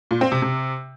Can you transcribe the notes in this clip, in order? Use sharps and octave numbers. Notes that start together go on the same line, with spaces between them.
A#2
C4
C3
C3